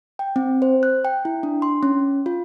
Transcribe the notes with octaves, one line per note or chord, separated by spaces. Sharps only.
G5
C4
C5
F#6
G5
E4
D4
C6
C#4
F4